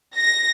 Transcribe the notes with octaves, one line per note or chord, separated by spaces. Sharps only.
A#6